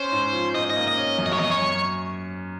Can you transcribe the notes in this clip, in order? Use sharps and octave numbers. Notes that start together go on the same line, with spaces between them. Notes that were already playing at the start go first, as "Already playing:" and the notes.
Already playing: C#4 C5
G#2
F3
G#2 D#5
D#5
A#3
D#5
C#4
F#2
D#5
C#5
F#2 D#5
C#5
F#2